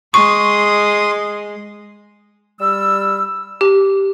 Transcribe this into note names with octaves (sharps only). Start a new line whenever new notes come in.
G#3 C6 C#6 D#6
G3 E6
G4